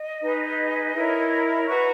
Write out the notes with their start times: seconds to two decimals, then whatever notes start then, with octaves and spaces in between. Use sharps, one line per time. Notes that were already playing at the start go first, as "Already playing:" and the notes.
Already playing: D#5
0.20 D#4 G#4 B4
0.94 E4 A#4 C#5
1.67 F#4 B4 A#5 C#6